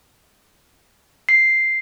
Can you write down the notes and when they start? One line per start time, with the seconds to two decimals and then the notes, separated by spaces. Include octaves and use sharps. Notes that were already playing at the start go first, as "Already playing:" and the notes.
1.29 C7